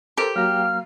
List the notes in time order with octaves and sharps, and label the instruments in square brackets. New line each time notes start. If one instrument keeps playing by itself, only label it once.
[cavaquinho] G4 [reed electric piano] A4 A#4 C5
[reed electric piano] F#3 A#3 A#5 [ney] F5 [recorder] F6